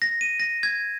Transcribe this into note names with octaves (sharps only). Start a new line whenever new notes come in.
A#6
D#7
A#6
G#6